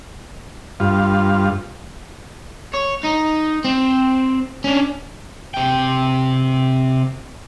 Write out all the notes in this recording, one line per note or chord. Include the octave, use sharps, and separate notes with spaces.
G2 F4
C#5
D#4
C4
C#4 D4
C3 G5